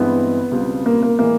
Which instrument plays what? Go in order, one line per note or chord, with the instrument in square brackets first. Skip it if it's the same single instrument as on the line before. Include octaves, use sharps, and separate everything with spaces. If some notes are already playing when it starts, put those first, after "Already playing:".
Already playing: [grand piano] G2 E3 G#3 C4 E4 [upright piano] B3
[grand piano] C#2 B2 G3 C4 F4
[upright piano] A#3
A#3
[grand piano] A2 E3 G#3 [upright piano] A#3